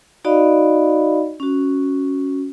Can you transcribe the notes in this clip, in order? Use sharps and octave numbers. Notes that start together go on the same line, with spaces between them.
D#4 F#4 D5 D#5 F5 B5
C#4 F#4